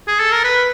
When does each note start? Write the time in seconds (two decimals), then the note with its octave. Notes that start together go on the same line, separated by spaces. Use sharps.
0.07 G#4
0.20 A4
0.32 A#4
0.44 B4